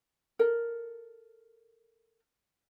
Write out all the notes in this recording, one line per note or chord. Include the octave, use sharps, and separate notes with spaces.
A4 A#4